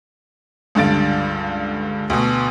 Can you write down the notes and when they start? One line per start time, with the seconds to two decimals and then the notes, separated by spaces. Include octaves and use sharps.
0.75 C#2 G2 D3 A6 D7
2.10 D2 B2